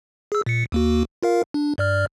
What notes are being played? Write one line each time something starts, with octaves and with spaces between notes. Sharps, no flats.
G#4 E6
A#2 C#7
D#2 A#3 F#4
F4 A#4 F5
D4
G2 D5 F6